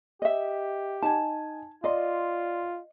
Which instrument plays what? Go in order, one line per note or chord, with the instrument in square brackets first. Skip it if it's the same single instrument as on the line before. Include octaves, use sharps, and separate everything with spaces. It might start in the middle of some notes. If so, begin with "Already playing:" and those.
[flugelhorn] G4 [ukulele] D#5 E5
[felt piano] D#4 G#5 [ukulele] A5
[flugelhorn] F4 [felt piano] D5 C6 [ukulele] D#5